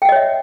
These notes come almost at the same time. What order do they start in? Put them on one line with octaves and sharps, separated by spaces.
G5 F#5 D#5 C#5 E5